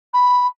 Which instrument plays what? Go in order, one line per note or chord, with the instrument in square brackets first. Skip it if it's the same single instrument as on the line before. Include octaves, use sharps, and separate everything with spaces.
[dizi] B5